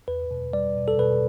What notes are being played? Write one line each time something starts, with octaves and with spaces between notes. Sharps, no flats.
E2 B4
B2
G3 D5
B2
A4
B2 B4